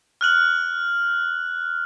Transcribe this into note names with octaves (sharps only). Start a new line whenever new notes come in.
F6 F#6 F#7